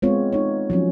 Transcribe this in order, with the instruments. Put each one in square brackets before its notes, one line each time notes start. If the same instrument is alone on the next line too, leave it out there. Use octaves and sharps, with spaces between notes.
[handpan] G#3 B3 C4 F4 C#5
D#4 C#5
F3 F#3 C#4